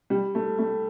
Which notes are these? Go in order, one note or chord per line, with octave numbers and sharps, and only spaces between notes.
G3
A3
A3